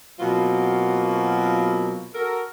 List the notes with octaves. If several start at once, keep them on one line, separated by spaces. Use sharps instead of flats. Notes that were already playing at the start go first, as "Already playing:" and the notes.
B2 F#3 A#3 C4 F4
F#4 A4 A#4